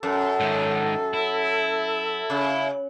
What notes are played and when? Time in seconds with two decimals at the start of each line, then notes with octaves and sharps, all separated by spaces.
0.03 F#2 A4
0.40 G#2 D#3
1.14 E4
2.30 C#3